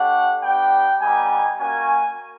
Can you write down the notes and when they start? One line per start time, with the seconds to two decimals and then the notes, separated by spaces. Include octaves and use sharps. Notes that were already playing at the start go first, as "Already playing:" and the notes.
Already playing: A3 D4 G4 F#5
0.43 B3 D4 G4 G5
1.01 G3 B3 D#4 G4 G#5
1.59 A#3 C#4 F#4 G#5